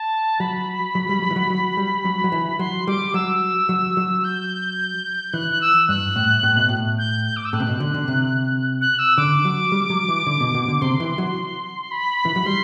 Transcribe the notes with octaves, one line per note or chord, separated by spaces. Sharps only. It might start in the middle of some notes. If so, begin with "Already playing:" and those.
Already playing: A5
F#3 B5
F#3
G3
F#3
E3
F#3
F#3
G3
F#3
F#3
E3
F#3 C6
G3 D6
F#3 E6
F#3
F#3
G6
E3 F#6
F#6
E6
G2 F#6
A2
A2
B2
A2
G6
G6
D6
E6
A2 F#6
C3
B2
D3
D3
C3
F#6
E6
D3 D6
F#3
G3
F#3
E3
D3
B2
B2
D3
C3 C6
E3
F#3
B5
E3
F#3
G3 C6